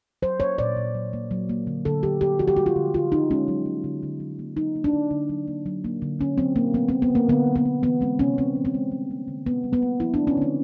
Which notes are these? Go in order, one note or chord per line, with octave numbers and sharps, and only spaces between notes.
F#3 C5
A#3 C#5
A#2 D5
A#2
F#3
A#3
F#3
A#3
D3
D3 A4
F#3 G4
A#3 G4
F3 F#4
G4
G#3 F#4
F4
D3
D3 F4
F3 D#4
G#3 C#4
F#3
A#3
D3
D3
F#3
A#3
F#3 D#4
A#3
D4
D3
D3
F#3
A#3
F#3
A#3
D3
D3 C#4
F#3 C4
A#3
F#3 B3
A#3 C4
B3
D3
A#3
D3 B3
F#3
B3
A#3
E3 B3
G#3 C4
C3 C#4
C3 C4
E3
C4
G#3
G3
A#3
D3
D3 B3
G3
B3
A#3
F3 E4
A3 D4
C#4
D3 C4